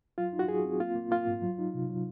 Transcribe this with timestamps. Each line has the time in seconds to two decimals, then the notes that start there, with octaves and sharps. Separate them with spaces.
0.18 F#3 F4
0.33 D#4
0.39 F#4
0.48 F#3 G#4
0.65 C4
0.80 A#3 F4
0.96 A#3
1.11 A#3 F4
1.27 G#2
1.42 F#3
1.59 D#4
1.74 C3
1.89 F#3